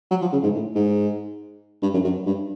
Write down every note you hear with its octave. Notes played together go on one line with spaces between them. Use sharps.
F#3
F3
C#3
G#2
A2
G#2
G2
F#2
F#2
G2